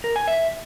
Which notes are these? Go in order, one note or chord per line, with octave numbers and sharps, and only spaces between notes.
A#4
G#5
E5